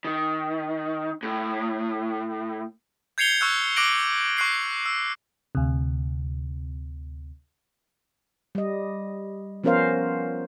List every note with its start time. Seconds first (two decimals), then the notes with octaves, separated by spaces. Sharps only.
0.05 D#3
1.23 A2
3.18 G6 G#6 C7 C#7 F7 G7
3.41 C#6 E6 F#6
3.76 D6 F#6 A#6 D7 F#7
4.37 C#6 F#6 C7 D7
4.86 E6
5.55 D2 C3
8.55 G3 D#5
9.64 F3 B3 C#4 A#4 C5 F5